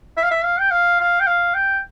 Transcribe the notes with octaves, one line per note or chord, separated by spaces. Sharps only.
E5
F5
E5
F5
G5
F5
F5
G5
F5
G5